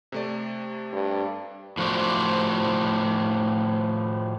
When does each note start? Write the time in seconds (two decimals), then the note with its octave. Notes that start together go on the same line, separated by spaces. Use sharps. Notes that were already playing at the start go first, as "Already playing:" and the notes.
0.12 C3 A3 D5
0.93 G2
1.77 A2 F3 F#4 C5 D5